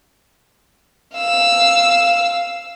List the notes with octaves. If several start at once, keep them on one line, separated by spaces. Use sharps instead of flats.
F5 E6